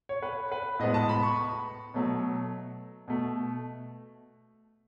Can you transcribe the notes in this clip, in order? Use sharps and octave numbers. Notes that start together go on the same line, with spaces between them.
C#5
B4
B4
A2 G#3 B3 D#5
A5
B5
C#6
B2 F#3 A3
B2 A3